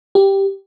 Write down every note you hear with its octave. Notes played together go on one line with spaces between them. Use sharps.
G4